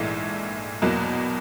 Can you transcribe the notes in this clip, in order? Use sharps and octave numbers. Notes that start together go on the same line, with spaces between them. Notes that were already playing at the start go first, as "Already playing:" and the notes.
Already playing: A#1 G#2 E3 A3
E2 B2 F#3 A#3